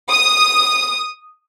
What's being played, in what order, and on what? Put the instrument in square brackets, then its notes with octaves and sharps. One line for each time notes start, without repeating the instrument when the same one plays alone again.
[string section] D#6